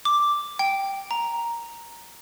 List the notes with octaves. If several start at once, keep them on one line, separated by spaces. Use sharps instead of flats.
D6
G5
A#5